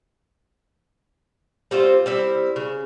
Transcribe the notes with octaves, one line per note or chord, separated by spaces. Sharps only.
G3 C4 F4 C5
G3 C4 E4
C#3